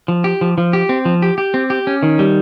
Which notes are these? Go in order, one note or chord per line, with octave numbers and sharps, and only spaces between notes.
F3
G4
F3
F3
G4
C4
F3
G4
G4
C4
G4
C#4
D#3
G3